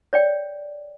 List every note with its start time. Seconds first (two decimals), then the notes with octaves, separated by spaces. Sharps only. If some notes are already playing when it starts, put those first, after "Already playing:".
0.13 C#5 D5 G5